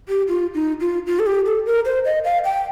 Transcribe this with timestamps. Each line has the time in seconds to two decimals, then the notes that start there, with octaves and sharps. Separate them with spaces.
0.09 G4
0.28 F4
0.54 D#4
0.81 F4
1.07 F4
1.19 A4
1.26 G4
1.46 A4
1.66 A#4
1.85 C5
2.05 D#5
2.25 F5
2.45 G5